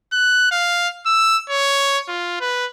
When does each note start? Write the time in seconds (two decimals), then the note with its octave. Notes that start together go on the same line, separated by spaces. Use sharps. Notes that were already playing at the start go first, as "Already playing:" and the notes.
0.12 F#6
0.51 F5
1.06 E6
1.50 C#5
2.08 F4
2.40 B4